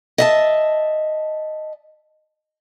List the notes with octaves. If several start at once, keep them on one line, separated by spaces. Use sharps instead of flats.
D#5 E5 A5